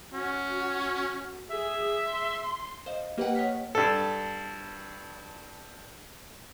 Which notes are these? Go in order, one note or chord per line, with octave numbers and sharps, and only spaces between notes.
C#4 F#4
G#4 E5
C6
C5 D#5 F5
A#3 G4 B4 D#5 F#5 G5
C#5 D#5 F#5 F6 B6
G2 A4